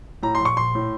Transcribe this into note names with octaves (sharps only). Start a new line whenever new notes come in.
A2 A#5
C6
A#1
C#6
A#1 C6
A2